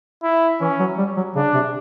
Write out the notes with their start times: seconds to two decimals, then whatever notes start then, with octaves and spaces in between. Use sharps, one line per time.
0.23 E4
0.60 E3 C#4
0.79 F#3
0.98 G3
1.17 F#3
1.35 C#3 D4
1.54 C3